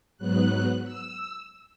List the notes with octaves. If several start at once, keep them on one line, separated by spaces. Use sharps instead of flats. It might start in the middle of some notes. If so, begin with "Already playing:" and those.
G#2 F#3 B3 F#6
E6